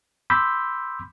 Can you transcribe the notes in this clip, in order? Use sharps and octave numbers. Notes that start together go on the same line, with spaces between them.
B5 C6 D6 E6 G6 B6